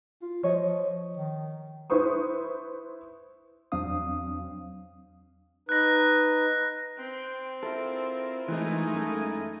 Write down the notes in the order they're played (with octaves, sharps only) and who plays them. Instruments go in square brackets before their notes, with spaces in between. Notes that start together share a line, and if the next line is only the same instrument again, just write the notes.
[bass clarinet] F4
[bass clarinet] F3 [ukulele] C#5 D#5
[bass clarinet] D#3
[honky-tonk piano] E4 B4 C5 C#6 D#6
[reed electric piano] E2 F#3 C4 D4 F5 D#6
[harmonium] D#4 B4 [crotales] F#6 A#6
[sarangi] C4 [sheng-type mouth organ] G5 C6
[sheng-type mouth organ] E4 F4 A#4 [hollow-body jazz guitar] A4
[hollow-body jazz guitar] E3 [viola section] G#3 A3 D#4 [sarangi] G#5
[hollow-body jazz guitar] F#2 A4